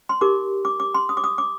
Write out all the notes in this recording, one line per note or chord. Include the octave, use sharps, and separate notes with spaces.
C6
D#4 G4 A#4 D6
D6
D6
C6
D#6
D6
D#6
D6